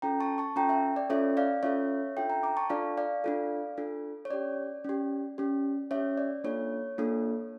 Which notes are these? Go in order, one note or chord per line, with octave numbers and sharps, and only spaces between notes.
C#4 F4 A4 G5 A#5
A5 C#6
A5 C#6
C#4 F4 A4 G5 A#5
E5 G5
D5
C#4 F4 A4 C#5 E5
D5 F5
C#4 F4 A4 C#5 E5
D4 F4 A4 E5 G5
G5 A#5
A#5 D6
A5 C#6
D4 F4 A4 D5 F5
D5 F5
D4 F4 A4
D4 F4 A4
C#5
C#4 G4 D5
C#4 G4
C#4 G4
C#4 G4 C#5 E5
D5
A#3 D4 F4 A4 C#5
A#3 D4 F4 A4